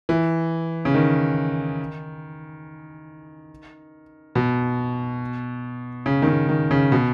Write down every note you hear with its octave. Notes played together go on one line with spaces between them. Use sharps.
E3
C#3
D#3
B2
C#3
D#3
C#3
D#3
C#3
B2